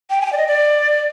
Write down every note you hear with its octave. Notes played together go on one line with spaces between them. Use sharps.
G5
G#5
G5
D5
D#5
D5